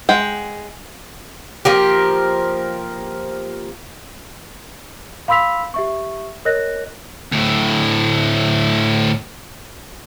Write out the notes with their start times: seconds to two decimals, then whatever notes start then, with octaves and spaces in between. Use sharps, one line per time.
0.09 G#3 F#5 G5
1.65 F3 A#3 G4
5.28 F5 B5 C6 E6 B6 F7
5.74 G4 E5 C#6
6.45 A#4 C#5 D#5 F#6 A#6
7.32 D2 A2